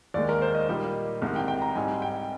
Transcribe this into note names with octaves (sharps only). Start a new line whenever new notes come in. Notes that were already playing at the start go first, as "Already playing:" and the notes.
D#2 D#3 G#3 D5
A#4
C5
D#5
A#2 G3 A#3 D#4
C2 C3 D#3 G#3
G5
G5
A#5
G#2 G3 C4 D#4 G#5
G5